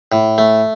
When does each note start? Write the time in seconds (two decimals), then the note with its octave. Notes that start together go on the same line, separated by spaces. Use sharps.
0.12 A2
0.38 A3